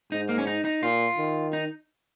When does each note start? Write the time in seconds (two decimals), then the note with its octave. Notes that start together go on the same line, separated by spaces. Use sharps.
0.11 G#2 D#4
0.29 A#3
0.38 C#4
0.47 D#4
0.65 D#4
0.82 A#2 F4
1.18 D#3
1.53 D#4